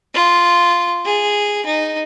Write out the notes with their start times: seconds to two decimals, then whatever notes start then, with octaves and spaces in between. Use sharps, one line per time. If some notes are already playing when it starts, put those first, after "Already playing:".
0.15 F4
1.05 G#4
1.66 D#4